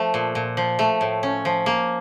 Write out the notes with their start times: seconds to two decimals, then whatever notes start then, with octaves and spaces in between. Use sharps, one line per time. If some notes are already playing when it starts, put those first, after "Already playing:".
Already playing: F3 A3
0.14 A#2
0.35 A#2
0.57 F3
0.79 A3
1.01 A2
1.23 C#4
1.45 F3
1.66 A#3